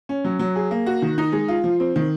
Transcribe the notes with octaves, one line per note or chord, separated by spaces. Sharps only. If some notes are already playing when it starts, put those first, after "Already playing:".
C#4
F#3
F#3
G#4
A#3
F#4
D#3
D#4
G#3
F4
F3
C4
D#3